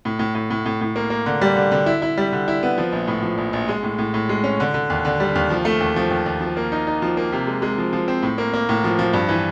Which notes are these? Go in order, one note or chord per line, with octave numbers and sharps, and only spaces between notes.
A2
A2
A2
A2
A2
A2
A#3
A#3
D3
G3
D3
D3
E4
E4
G3
D3
E4
B3
F3
A#1
A2
F3
A#1
A#1
G#3
A2
A2
A2
G#3
C#4
D3
D3
D#2
D3
G3
D#2
F3
A3
D#2
F3
D#2
D#2
F3
A#3
D#4
D#4
F3
A#3
C3
G#3
G#3
F3
F3
C4
A2
A#3
A#3
A2
F3
F3
G2
E3